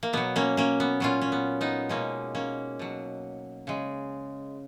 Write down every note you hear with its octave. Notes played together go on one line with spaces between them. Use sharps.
A#3
B2 F#3 B3
A#3 C#4
A#3 C#4
B3
A#2 F#3 C#4 F4
C#4
B3
B3 D#4
B2 G#3 A#3 C#4
A#3 C#4
B2 F#3
C#3 G#3